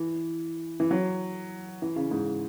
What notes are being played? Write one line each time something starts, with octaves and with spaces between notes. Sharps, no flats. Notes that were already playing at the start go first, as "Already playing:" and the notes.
Already playing: E3
E3
F#3
E3
C#3
G#2